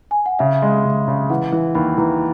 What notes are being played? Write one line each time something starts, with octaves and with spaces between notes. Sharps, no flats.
G#5
F#5
C#3 E5
G#3
C#3
C#3
E3 F#5
E3
D#2 B5
E3 A#5